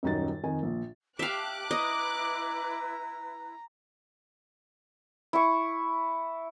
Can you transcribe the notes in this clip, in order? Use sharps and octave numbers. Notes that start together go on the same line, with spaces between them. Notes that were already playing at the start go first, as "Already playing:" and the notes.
D#1 F#2 D#4 F#4 A6
F2 D#3 G#5
A#1 A#2
G4 E5 F5 A5 D6 F#6
E4 B4 D#5 A#5
E4 C#6